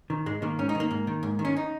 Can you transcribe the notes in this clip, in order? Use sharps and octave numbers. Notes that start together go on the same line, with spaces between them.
D#3
G#2 G#3
D#3 A#3
G#2 C#4
D#4
D#3
A#3
G#2
D#3
G#2
D#3
C#4
D#4